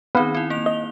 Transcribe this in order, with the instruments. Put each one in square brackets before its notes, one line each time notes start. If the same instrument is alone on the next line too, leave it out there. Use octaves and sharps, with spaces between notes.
[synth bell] D#3 C4 D#4 [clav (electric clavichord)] B3 B4 F5
[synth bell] C4 E4
A#3 F7
[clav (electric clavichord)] D#5 [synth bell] G7